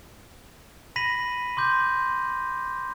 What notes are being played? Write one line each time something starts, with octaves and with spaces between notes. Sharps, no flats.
B5 A#6 B6 D#7 F#7
C6 D6 G6